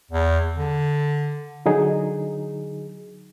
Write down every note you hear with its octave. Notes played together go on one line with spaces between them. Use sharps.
E2
D3
D3 F#3 D#4 G#4